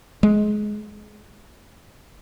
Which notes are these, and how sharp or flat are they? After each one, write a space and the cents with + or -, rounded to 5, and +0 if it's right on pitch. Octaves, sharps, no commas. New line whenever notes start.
G#3 +20